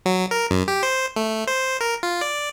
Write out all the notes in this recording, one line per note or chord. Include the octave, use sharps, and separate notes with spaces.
F#3
A#4
F#2
G4
C5
A3
C5
A#4
F4
D5